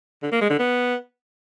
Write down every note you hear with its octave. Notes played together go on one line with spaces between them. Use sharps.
D3
A#3
G#3
D3
B3